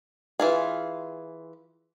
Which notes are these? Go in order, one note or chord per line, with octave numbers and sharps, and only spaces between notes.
E3 F4 G#4